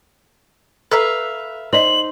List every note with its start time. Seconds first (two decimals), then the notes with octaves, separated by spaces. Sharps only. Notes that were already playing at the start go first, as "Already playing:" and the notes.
0.91 A4 B4 E5 F5 A#5
1.73 D#4 C5 D5 D#5 F#7